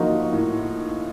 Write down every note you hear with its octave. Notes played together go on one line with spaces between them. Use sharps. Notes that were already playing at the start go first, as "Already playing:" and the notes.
Already playing: F3 A#3 D#4 F#4
A2